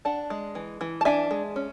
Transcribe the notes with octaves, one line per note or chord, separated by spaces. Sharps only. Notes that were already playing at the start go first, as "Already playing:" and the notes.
D4 F#5 A5
G#3
E3
E3
A5
D4 E5 G#5
G#3
C#4